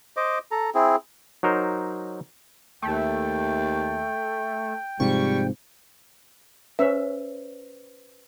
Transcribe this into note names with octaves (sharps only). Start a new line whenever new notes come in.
C5 D#5 D6
A4 A#5
C4 E4 G#4
F#3 D#4 A#4 C5
D#2 A3 G5
G#2 C3 F3 G3 C#6
C#4 B4 C5 E5